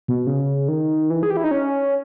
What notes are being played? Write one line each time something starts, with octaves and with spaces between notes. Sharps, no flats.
B2
C#3
D#3
E3
G#4
G4
E4
D#4
C#4